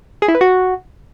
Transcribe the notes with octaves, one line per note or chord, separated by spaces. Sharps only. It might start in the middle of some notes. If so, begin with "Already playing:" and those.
G#4
E4
B4
F#4